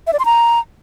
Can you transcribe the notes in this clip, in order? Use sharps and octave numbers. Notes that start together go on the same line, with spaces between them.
E5
D5
C6
A#5